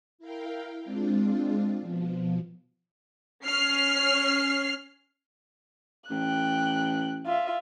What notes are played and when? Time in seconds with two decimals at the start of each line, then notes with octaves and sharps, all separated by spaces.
0.19 E4 A#4 F5 G5
0.84 G#3 C4 D4 F4
1.81 B2 F3
3.46 C#4 F6 C7
6.10 A1 G5 F#6
7.26 F4 E5